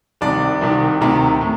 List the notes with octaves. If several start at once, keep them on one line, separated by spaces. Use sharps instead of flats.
C2 C3 D#3 D5
C2 C3 D#3
D2 C3 D#3 A#5
A2